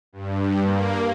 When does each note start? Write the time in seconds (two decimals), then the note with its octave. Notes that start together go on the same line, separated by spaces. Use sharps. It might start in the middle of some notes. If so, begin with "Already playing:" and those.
0.13 G2
0.63 A#3